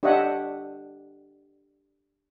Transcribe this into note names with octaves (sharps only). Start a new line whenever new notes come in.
D4 G4 C#5 D#5 E5 F#5